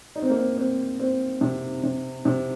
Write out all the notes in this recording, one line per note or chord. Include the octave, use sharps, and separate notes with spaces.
D#4
C4
A#3
C4
C4
C4
C3
C3
C3